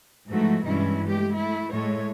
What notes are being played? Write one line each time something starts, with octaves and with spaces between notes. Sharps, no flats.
G#2 E3 F3 A3 F#4
G2 B2 E3 G#3 C#4 E4
G#3 A3 G4
A3 E4
A2 G#3 A3 C#5